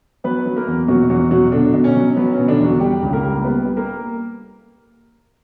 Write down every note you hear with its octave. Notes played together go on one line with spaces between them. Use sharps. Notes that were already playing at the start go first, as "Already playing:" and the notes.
F#3 B3 B4
F#3
A#3 A#4
E2
B2 F#3 F#4
E2 F#3 F#4
B2 F#3 F#4
B2 D3 D4
B2
C#4
F#3
F#3 B3
B2 C#4
D3 D4
E2
F#3 F#4
G3 G4
C#2
A#3 A#4
G3
G3 B3 B4
G3
A#3 A#4